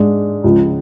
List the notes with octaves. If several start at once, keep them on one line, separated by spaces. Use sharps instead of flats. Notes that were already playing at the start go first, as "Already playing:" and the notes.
Already playing: G#2 G#3 D4
C#2 C#3 F3